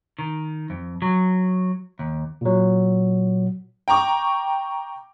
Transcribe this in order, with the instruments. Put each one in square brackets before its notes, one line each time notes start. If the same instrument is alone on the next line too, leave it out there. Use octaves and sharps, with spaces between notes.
[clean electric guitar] D#3
F2
F#3
D#2
[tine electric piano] A#2 F#3
[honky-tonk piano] G5 A#5 C#6 D6